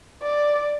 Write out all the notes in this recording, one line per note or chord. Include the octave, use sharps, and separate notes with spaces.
D5